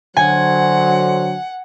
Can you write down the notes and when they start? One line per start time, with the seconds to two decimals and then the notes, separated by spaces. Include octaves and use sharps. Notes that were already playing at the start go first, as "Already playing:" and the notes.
0.17 D3 F#3 C5 F#5 G#5